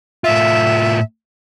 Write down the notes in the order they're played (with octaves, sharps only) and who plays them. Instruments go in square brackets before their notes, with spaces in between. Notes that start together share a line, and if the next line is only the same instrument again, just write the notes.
[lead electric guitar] A2 F4 [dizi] E5